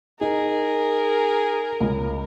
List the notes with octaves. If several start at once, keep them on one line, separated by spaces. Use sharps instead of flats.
D#4 G#4 A#4
C#2